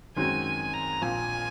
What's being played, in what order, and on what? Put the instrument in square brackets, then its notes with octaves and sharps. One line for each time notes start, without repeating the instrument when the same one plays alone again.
[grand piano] F#2 D#3 G#3 C4 F#4 [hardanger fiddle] G#5
[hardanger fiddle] G#5
A#5
[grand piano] A#1 A#2 F3 C4 [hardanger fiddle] G#5